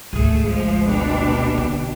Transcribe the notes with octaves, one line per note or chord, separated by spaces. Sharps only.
G#1 D2 A3 G#4
F3 G#3
B2 D4 G4
D3